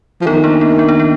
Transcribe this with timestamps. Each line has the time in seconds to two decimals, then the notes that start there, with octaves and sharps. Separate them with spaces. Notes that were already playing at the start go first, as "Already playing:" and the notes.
0.22 F3
0.27 D#3 B3 D#4
0.44 A#3 D4
0.61 B3
0.79 B3
0.89 D4
1.00 B3